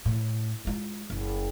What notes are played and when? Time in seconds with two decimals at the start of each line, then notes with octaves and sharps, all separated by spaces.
0.05 A2
0.65 G#3 F4
1.10 F#1